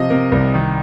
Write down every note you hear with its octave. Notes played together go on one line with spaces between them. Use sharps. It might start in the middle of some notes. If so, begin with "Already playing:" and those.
Already playing: C3 F3 D#5
C3 A#4
C2 A#4
D#3